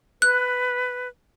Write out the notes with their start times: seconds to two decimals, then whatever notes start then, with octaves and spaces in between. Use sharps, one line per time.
0.22 B4 F#6